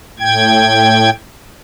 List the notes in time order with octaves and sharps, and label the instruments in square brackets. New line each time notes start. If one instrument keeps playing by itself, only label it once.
[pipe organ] A2 G5 G#6